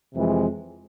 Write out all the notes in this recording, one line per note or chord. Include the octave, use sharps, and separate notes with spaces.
F2 C3 E3 G#3